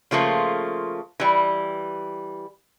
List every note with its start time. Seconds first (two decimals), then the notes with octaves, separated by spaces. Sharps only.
0.11 C#3 F3 A3 A#3 F4
1.20 E3 G3